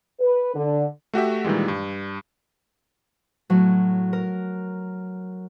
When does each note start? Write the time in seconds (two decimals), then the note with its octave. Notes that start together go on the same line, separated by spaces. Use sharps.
0.21 B4
0.55 D3
1.13 A3 F#4 G4 E5
1.44 A#2 D#3 E3 G3 G#3
1.68 G2
3.50 A2 F#3
4.13 A#4